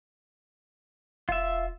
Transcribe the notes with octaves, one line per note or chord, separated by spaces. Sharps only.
E1 F4 E5